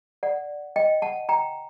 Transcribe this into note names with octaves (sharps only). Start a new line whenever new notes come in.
D5 F#5
D#5 G5
F#5 A5
G5 A#5